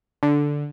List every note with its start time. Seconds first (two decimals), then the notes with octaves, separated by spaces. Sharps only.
0.23 D3